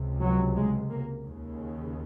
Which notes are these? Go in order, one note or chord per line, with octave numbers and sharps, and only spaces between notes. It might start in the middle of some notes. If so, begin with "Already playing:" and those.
Already playing: C#2 C3
F#3
G#3
A#3
D#2 C#3